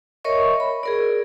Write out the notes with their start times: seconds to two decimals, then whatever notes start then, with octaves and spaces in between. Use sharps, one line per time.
0.24 A#4 C#5 D#5 E5 C#6
0.60 B5
0.83 G#4 A#4 D5